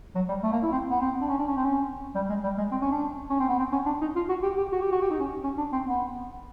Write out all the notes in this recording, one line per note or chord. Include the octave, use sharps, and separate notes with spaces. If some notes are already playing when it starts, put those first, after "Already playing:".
F#3
G3
A3
A#3
E4
C4
B3
C4
D4
C#4
D4
C#4
C4
C#4
G3
G#3
G3
G#3
C4
C#4
D4
C#4
C4
B3
C4
C#4
D4
D#4
F4
F#4
G4
G4
F#4
G4
F#4
G4
D#4
C#4
C#4
D4
C4
B3